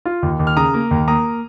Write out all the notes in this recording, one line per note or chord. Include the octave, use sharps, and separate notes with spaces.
F4
D#2
D#2
F6
C#3 A#5 D#6
A#3
D#2
A#3 A#5 D#6